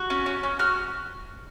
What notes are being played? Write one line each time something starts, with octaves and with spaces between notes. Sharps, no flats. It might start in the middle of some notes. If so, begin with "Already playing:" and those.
Already playing: F#4 C#6
C#4
C#4
C#4
F#4 F6